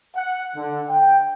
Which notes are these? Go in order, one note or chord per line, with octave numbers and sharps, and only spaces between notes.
F#5
D3
G5